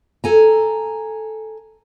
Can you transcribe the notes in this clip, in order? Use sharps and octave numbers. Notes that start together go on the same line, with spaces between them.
A4 G#5 A#5